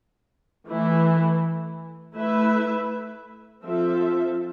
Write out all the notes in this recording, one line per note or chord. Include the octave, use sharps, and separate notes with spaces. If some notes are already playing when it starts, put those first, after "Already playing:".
E3 A3 E4
A3 E4 B4 E5
F3 C4 F4 A4 E5